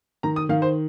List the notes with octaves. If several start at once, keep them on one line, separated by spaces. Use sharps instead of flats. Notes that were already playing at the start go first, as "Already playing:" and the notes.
D#3 A#5
D#6
D#3 F5
C5